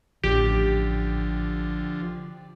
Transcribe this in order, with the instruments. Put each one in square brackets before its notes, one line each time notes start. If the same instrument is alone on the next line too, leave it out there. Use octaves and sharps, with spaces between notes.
[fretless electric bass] A1 [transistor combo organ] D3 F3 [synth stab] G4